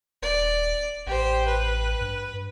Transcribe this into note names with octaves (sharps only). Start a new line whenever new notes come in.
D#1 D5
A1 G4 C5
B4
G2